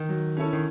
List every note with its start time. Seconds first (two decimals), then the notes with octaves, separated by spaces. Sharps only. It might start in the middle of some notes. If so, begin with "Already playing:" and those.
Already playing: D#3
0.09 F#3
0.37 C#4 E4 A4 C#5
0.53 D#3